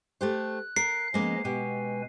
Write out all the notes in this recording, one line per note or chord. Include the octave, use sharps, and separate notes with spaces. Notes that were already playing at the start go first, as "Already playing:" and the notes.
A3 G4 C5 F#6
A#4 C7
F3 G#3 A#3 B3 C#4 D#5
B2 G#3 G4 B4 G#5